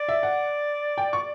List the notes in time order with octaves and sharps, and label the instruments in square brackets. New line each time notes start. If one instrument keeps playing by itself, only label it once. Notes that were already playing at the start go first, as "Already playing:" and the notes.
Already playing: [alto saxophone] D5
[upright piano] E5
F#5
G5
C#6